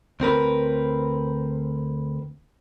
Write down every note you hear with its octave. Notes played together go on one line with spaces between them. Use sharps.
D2 C4 A#4 B4